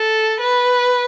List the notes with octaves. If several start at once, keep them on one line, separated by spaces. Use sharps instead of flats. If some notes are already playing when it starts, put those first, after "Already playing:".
Already playing: A4
B4